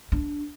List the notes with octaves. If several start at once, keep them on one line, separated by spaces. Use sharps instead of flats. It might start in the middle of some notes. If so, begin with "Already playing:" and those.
D4